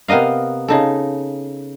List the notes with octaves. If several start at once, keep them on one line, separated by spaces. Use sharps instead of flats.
C3 B3 A#4 D#5 F5
C#3 D#4 A4